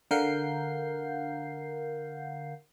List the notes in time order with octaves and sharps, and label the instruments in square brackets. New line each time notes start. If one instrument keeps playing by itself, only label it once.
[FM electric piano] D3 A#4 F5 F#5 G6 C7